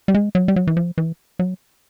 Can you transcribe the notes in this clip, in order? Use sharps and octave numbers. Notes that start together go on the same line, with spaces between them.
G3
G#3
F#3
G3
F#3
E3
F3
E3
F#3